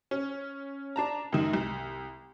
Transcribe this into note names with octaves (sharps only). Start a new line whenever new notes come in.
C#4
D4 A5 A#5
F#2 D#3
C2